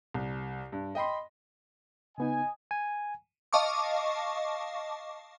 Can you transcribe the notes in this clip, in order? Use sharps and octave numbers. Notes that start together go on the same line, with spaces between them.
C2
G2
D#5 G5 B5 C6
C#3 B3 D#4 D#5 G#5
G#5
D#5 F5 A5 C#6 D6